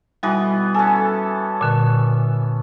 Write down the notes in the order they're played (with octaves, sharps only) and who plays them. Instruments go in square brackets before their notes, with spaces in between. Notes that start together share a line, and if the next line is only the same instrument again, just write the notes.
[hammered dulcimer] B2 E3 B3 [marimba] G3
[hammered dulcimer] C#4 A4 [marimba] G#5
[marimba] A#2 D3